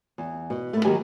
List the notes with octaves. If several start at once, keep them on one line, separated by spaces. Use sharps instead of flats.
E2
B2
A3 B3
D#3 F#3 A#3 G4 B4 G#5